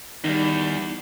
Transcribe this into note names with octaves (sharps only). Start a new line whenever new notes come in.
E2 D#3 G3 D#4